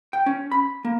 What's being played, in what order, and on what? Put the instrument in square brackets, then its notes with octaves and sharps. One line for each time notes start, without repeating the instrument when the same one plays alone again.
[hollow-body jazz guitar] G5
C#4
B5
A#3